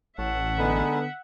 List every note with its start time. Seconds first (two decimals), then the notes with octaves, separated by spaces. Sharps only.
0.18 A1 C#5 E5 F#5 A5
0.58 D3 G#3 B3 D#4 B4